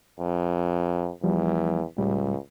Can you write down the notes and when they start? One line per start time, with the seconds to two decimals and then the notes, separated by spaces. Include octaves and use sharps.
0.20 F2
1.24 E2 F3 G3
1.98 C#2 A2 G3